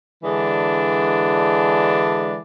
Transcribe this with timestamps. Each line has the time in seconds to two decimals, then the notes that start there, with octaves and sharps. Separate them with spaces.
0.23 D3 E3 G#3 D4